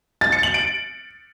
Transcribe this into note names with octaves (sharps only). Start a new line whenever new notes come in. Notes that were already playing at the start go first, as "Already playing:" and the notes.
A6
C#7
F#7
D7